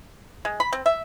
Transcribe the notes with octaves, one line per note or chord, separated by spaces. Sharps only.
G#3
B5
C4
E5